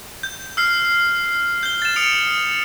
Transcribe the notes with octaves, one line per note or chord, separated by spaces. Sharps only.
G6
E6 F6 C7
G6 G7
A6 E7
D#6 C#7 D7 F7